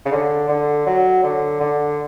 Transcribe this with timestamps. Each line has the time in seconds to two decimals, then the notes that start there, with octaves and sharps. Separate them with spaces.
0.05 C#3
0.12 D3
0.49 D3
0.87 F#3
1.24 D3
1.60 D3